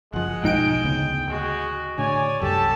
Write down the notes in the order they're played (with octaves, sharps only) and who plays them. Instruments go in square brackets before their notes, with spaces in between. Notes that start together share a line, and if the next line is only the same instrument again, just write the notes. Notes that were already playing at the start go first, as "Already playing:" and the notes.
[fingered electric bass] F#1 F3 [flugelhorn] G#3 [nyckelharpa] F#5
[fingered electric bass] B1 F3 [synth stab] G#2 D#4 D7 [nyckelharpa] G5
[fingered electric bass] D2 C#3 B3
[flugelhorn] G#3 [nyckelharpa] F#4
[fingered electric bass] A2 D3 [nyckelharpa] C#5 D5 [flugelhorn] G#5
[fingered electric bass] C2 F#2 [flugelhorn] G4 [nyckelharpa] A4 A5